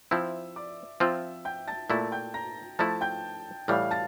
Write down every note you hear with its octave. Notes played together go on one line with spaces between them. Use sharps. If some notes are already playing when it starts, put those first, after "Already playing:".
F3 C4 E4 E5 E6
D5 D6
F3 C4 F4 E5 E6
G5 G6
A5 A6
A#2 A3 E4 A5 A6
G5 G6
A#5 A#6
F3 A3 E4 A5 A6
G5 G6
A2 E3 G3 F5 F6
A5 A6